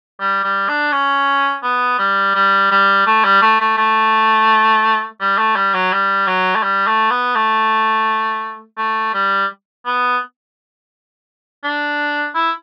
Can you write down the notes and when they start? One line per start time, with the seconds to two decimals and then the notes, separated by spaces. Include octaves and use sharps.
0.20 G3
0.44 G3
0.69 D4
0.92 C#4
1.63 B3
1.99 G3
2.35 G3
2.71 G3
3.06 A3
3.24 G3
3.42 A3
3.60 A3
3.77 A3
5.20 G3
5.38 A3
5.56 G3
5.74 F#3
5.93 G3
6.27 F#3
6.55 A3
6.63 G3
6.87 A3
7.11 B3
7.35 A3
8.77 A3
9.14 G3
9.85 B3
11.64 D4
12.35 E4